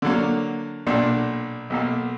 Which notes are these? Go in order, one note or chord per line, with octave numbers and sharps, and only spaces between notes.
D3 F#3 A#3
B1 A#2 A#3 D4
B1 B2 A#3